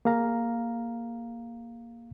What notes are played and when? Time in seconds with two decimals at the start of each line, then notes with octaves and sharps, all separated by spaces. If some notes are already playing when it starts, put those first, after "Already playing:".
0.05 A#3 G#4 F5 A#5